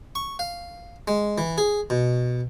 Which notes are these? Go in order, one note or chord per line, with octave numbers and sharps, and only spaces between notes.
C#6
F5
G#3
E3
G#4
B2